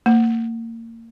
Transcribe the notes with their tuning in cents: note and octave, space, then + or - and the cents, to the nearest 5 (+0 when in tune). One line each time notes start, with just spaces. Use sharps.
A#3 -30